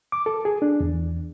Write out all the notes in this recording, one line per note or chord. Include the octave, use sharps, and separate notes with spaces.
D6
A4
G#4
D4
E2